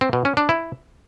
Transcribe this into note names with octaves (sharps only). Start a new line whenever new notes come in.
C4
B2
C#4
D4
E4